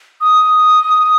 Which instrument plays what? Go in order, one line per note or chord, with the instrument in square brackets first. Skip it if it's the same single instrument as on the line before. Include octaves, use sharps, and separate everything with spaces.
[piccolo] D#6